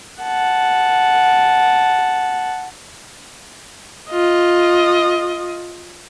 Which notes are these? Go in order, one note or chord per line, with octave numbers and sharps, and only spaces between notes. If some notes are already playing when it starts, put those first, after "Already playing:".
F#5 A5
F4 D#5